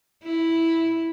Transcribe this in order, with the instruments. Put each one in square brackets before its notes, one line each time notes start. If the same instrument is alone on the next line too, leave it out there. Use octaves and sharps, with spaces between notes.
[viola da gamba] E4